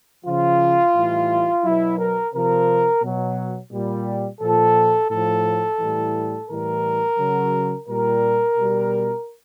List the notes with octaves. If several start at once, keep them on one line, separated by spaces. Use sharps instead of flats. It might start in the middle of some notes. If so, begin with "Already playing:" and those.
C#3 F3 F4
A2 E3 G3
B2 F#3 E4
A#4
C3 F3 A#4
B2 F#3
A#2 G3
A#2 F3 A4
A2 F3 A4
A2 E3 G3
A2 E3 G3 A#4
C#3 F#3
A#2 G3 A#4
B2 G3